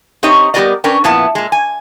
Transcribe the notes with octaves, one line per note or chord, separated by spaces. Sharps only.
C4 D#4 G4 C#5 D#5 A#5
G3 B3 G4 A#4 D5 D#5
C#4 D4 A#4 B4 G5
F2 A#2 B3 E4 A5
A#2 G#3
G#5